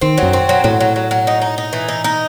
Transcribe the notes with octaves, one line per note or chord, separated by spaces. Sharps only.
D#3 C4
F#3
F#2
C4
F#3
A2 F#3
F#3
F#3
F#3
D#4
D#4
D#4
E3
D#4
D#4